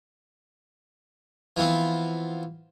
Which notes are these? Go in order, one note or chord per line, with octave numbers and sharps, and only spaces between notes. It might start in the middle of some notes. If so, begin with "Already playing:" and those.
E3 F3 B3 C4